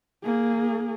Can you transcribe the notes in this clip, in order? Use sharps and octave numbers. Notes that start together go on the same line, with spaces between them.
A#3 G#4